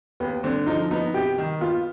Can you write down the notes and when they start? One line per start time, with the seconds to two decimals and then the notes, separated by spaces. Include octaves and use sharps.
0.20 D#2 B3
0.43 D3 C4
0.67 F3 D#4
0.91 B3 D#4
1.14 C3 G4
1.38 D#3
1.61 B3 F4